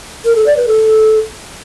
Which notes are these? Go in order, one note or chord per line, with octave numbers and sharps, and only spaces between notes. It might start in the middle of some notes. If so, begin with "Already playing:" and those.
A#4
A4
D5
B4
A4